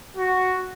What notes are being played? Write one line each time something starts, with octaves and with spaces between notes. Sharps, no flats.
F#4